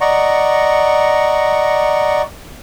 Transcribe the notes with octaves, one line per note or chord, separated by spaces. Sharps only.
D5 D#5 F#5 A#5 C#6